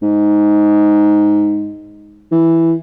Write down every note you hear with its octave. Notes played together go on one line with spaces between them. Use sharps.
G#2
E3